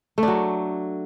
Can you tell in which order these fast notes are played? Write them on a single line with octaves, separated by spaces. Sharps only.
A3 D4 F#3